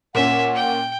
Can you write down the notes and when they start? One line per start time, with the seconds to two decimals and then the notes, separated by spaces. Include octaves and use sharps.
0.15 A#2 C#4 E5 F#5
0.55 G5